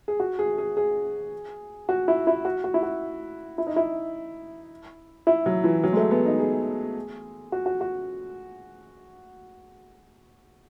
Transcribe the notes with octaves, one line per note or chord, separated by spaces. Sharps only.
G#4
F#4
G#4
G#4
G#4
F#4
E4
E4
F#4
F#4
E4
F#4
E4
D#4
E4
E4
F#3
E3
F#3
G#3
A3
B3
D#4
G#4
F#4
F#4
F#4